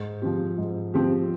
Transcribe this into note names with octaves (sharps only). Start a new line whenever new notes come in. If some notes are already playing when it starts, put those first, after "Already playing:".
Already playing: G#2
F3 C4 G4
G#2
F3 C4 G4